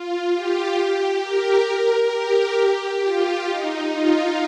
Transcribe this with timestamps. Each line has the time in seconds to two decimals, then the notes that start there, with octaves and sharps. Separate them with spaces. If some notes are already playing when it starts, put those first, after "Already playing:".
Already playing: F4
0.34 G4
1.24 A#4
2.13 G4
3.03 F4
3.48 D#4
3.92 F4